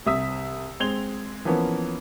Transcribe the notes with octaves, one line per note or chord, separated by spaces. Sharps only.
C2 C3 E5 D#6 E6 B6
G#3 C4 G#6 F7 G7
E3 F3 A#3 B3 C#4